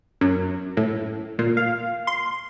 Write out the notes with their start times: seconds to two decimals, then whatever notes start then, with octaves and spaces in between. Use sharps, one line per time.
0.21 F#2
0.77 A2
1.39 A#2
1.57 F5
2.07 C6